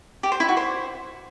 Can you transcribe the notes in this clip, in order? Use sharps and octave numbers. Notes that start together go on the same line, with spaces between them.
G4
C5
E4
F#4
C5